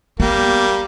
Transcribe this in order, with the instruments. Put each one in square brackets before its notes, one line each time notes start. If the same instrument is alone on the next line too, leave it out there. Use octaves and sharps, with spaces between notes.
[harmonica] G3 A#3 [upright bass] B3